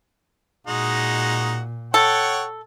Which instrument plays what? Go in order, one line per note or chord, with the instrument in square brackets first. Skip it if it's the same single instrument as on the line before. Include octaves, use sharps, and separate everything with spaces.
[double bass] A#2 [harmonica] G#3 D#4 F#4
[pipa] A4 [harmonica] C#5 F#5 G5